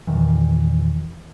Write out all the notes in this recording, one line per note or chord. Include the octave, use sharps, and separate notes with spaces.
E2 A#2 D#3 E3